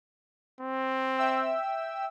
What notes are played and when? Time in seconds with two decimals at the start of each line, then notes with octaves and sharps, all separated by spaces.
0.61 C4
1.16 E5 G5 E6